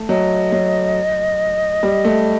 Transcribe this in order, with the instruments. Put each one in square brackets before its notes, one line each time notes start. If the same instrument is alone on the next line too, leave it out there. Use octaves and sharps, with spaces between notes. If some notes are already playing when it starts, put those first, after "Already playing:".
Already playing: [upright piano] A3
[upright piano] F#3 [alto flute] D#5
[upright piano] F#3
G3
A3